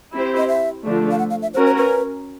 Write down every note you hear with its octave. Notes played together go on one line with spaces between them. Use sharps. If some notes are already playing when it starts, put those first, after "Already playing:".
C4 E4 G4 C5
D#5
E5
D3 F3 A3 D4
F5
F#5
F5
E5
C#4 F#4 A#4 C5
C5
B4